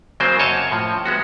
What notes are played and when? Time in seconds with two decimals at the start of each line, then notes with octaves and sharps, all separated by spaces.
0.20 C#3 F#3 A#3 C4 C5
0.39 F#2 C#5 D#5 A5
0.71 A2 F3
1.05 G#3 B3 F#4